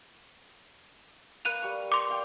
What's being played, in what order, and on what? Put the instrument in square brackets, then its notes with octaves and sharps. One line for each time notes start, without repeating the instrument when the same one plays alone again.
[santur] A#3 B4 F5 [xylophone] F#6 D#7 F7
[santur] G3 C#6
[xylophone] C6 D6
[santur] D5 F5 G5